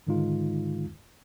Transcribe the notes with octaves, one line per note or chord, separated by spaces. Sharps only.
G#2 D3 D#3 G#3 D#4 F4